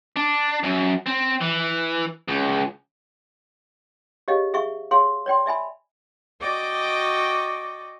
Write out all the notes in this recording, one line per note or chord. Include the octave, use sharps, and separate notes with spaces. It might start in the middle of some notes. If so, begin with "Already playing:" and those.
D4
F#2
C4
E3
C#2
G4 G#4 C#5 D#5 F5
G#4 E5 F5 C#6
G#4 C#5 F5 C6
C#5 D5 G5 C6
D5 E5 G#5 B5
F#4 D5 D#5 G5 D6